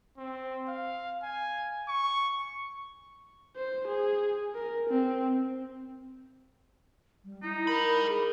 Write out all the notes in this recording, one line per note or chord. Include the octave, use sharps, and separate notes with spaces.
C4
F5
G#5
C#6
C5
G#4
A#4
C4
G3
D#4 E4
G4 A#4 B5
G#4